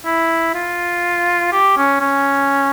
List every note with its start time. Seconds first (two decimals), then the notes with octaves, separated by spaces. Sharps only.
0.06 E4
0.54 F4
1.52 G4
1.77 C#4
2.01 C#4